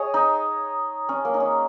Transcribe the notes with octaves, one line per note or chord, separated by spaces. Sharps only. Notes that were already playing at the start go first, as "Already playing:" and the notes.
Already playing: G#4 C#5 D#5
D#4
C#4
A#3
D#4
C#4